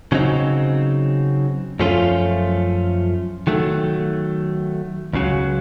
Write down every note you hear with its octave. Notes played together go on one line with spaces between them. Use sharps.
C#3 F#3 C4 D#4
F#2 F3 A3 C#4 F4
D#3 F#3 A3
C#2 C#3 F#3